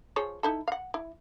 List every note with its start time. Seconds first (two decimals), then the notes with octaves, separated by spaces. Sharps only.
0.16 F3 G#4 C#5
0.43 D#4 E4 A4
0.68 F5 F#5
0.94 E4